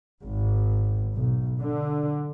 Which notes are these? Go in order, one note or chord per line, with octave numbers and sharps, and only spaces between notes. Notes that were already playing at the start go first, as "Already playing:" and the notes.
G#1
B1
D3